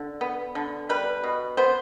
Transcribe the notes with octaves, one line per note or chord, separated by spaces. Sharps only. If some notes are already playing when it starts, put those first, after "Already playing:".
Already playing: D3
B3
D3
G3 B4
B2
B3 C5